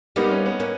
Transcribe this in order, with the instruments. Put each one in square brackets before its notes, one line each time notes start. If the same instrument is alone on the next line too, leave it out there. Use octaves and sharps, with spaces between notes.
[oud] G3 A#3 [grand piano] B3 D#4
[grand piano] C#4
B3
[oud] A#3 C#4